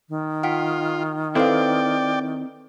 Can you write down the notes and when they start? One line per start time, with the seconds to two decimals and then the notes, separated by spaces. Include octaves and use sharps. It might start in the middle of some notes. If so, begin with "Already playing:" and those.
0.09 D#3
0.43 F4 F#5 G5 B6
1.35 C4 E4 A4 B4 D5 F5 G5